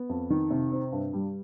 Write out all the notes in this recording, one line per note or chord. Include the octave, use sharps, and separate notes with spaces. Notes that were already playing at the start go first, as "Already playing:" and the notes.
Already playing: B3
F2
D#3
C3
C4
G2
G3